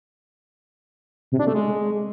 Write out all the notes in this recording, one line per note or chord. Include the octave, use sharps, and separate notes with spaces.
C3
D4
A3
G#3